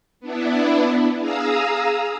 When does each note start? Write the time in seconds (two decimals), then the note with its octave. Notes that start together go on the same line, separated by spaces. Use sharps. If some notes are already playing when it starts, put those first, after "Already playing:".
0.20 B3 D4 E4
1.20 G#4 F5 A#5 D#6 E6